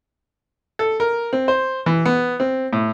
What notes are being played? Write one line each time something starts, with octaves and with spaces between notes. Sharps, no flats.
A4
A#4
C4
C5
E3
B3
C4
A2